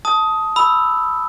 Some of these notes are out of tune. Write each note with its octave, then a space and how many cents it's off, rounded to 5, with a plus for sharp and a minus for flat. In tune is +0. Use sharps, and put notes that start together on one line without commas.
A5 +0 D#6 +15
B5 +0 E6 +0